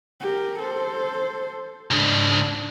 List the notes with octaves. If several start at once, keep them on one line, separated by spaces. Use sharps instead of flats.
G4 A#4
A4 C5
C#2 G#2 D4